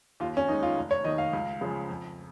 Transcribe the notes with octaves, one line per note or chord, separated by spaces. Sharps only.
D#2 F4
C#4
D#3 G#3 D#4
F4
F1
C#5
D#2 D#3 D#5
F5
C#2
C#3 F3 G#3
F2